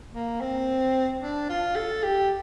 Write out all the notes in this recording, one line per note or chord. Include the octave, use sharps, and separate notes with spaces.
A#3
C4
D4
F4
A4
G4